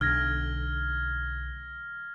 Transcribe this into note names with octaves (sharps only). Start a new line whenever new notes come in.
B1 D3 F6 G#6 A#6